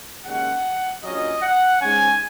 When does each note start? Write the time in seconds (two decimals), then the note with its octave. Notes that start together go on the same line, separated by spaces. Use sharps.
0.25 D#2 C#3 G#3 C#4 F#5
1.03 A#1 A#2 F#3 C#4 D#5
1.42 F#5
1.81 G#2 G#3 C#4 G#5